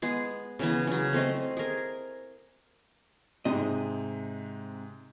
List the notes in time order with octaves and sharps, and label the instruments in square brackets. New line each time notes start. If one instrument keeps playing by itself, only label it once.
[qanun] G#3 B3 G#4
C#3 E3 B3
C#3 F#3
A3 C4 C5 D#5
G#4 A#4
[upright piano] G#2 C3 [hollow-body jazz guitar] C4 D#5